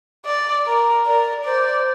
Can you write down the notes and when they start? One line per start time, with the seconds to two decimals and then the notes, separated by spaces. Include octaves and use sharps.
0.26 D5
0.67 A#4
1.06 A#4 D5
1.45 C5 D5